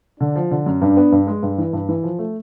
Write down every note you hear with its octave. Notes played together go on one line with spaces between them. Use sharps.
D3 D4
F3
D3
F#2
G2 D4
B3
G2
G#3
G2
E3
G2
E3
F3
A3